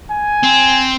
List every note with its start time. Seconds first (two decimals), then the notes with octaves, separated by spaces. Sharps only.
0.12 G#5
0.43 C4